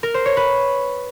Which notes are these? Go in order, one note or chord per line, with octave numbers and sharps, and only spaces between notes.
A#4
C5
C#5
B4